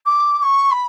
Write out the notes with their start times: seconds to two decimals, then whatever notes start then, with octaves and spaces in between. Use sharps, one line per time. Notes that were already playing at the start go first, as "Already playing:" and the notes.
0.06 D6
0.38 D6
0.42 C#6
0.71 B5